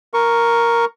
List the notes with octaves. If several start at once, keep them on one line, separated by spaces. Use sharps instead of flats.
A#4 C#6